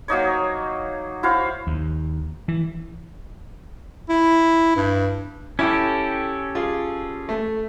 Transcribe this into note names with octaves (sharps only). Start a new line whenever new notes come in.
F#3 A#3 D#4 C#5
E4 F#4 C5 F5
D#2
E3
E4
G2
C#4 E4 G4 A4
F4 G#4
A3